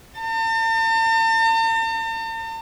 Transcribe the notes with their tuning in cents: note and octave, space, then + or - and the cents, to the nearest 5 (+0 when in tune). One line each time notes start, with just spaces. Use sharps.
A5 +45